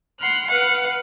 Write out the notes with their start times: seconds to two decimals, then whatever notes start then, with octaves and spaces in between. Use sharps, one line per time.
0.19 F#5 B5 C6 F6 F#6
0.49 B4 F5 F#5